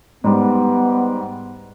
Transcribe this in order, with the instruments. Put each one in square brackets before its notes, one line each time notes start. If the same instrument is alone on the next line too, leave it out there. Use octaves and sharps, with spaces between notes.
[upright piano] G#2 G3 [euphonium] B3